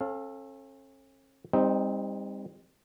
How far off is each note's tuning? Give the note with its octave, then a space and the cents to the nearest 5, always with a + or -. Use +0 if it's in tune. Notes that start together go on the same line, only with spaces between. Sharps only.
C#4 -40 A4 +0 F5 +0
G3 +40 C4 +0 D#4 +0